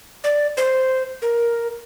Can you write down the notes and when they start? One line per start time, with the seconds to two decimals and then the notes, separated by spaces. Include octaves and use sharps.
0.24 D5
0.57 C5
1.22 A#4